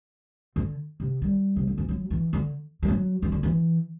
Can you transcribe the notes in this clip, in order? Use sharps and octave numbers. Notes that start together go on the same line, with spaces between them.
D3
C3
G3
C3
D3
E3
F#3
E3
D3
G3
F#3
E3
D3
E3